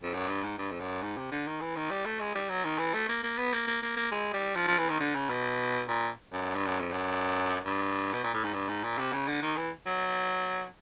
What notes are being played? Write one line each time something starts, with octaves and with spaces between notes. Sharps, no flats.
F2
F#2
G2
G#2
G2
F2
F#2
G#2
C3
D3
D#3
E3
D#3
G3
A3
G#3
G3
F#3
D#3
E3
A3
A#3
A#3
B3
A#3
A#3
A#3
A#3
G#3
G3
F3
F3
E3
D#3
D3
C#3
B2
A#2
F#2
G2
F#2
F2
F#2
G2
B2
A#2
A2
G#2
G2
G#2
A#2
C3
C#3
D3
D#3
E3
F#3